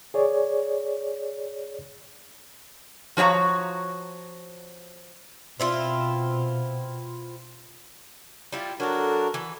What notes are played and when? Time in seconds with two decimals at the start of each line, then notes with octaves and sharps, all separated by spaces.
0.14 G#4 C#5 D5
3.17 F3 F#4 C#5 E5 A#5
5.60 B2 C4 E4 F4
8.52 G3 E4 F4
8.80 F#3 D4 F#4 A4 A#4
9.34 E3 B4